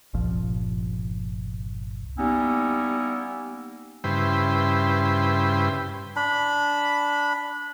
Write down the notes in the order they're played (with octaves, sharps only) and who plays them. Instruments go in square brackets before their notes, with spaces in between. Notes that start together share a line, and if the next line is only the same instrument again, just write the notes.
[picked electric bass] G1 C2 A#2 F3
[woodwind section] G3 A#3 B3 C#4 D#4 E4
[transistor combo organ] G2 C#3 E4 B4 C5 G5
[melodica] D4 B5